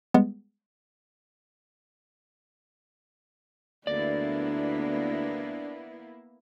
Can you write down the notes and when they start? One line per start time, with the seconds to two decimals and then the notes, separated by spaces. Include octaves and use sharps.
0.14 G3 G#3 B3
3.87 D2 A#3 B3 D4 E4 D5